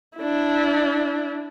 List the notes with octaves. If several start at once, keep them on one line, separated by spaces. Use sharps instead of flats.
D4 E4